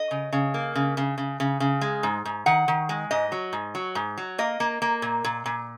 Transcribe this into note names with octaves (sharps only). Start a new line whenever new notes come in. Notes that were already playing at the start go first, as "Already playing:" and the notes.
Already playing: D#5
C#3
C#3
A#3
C#3
C#3
C#3
C#3
C#3
G#3
G#2
G#2
D#3 F#5
D#3
G#3
G#2 D#5
F#3
G#2
F#3
G#2
F#3
A#3 D#5
A#3
A#3
A#2
A#2
A#2